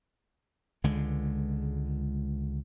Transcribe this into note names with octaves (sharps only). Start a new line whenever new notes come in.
C#2 D3 G#3